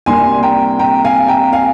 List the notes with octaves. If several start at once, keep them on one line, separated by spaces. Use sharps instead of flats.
C2 C3 G3 A#3 D4 G#5 C6
G5 A#5
G5 A#5
F5 G#5
G5 A#5
F5 G#5